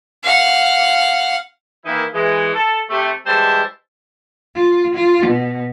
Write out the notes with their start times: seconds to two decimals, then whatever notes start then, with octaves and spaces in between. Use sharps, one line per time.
0.24 F5 F#5
1.86 D#3 E3 A#3 D#4 E4
2.14 E3 G#3
2.54 A4
2.90 C3 A3
3.26 E3 G3 G#3 C5 E5 A5
4.55 F4
4.95 F4
5.27 B2